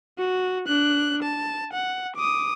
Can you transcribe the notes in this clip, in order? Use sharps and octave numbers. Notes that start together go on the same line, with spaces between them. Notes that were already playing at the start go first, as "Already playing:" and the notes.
F#4
D4 F#6
A5
F#5
D6 D#6